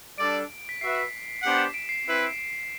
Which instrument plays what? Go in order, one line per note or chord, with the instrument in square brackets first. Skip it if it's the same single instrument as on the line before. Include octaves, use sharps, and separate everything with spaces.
[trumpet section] G3 D4 A4 D5 [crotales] D7
[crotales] B6
[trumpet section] F#4 B4 E5 [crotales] C7
[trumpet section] B3 D4 G4 C5 F#5
[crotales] E7
D7
C7
[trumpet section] C4 E4 B4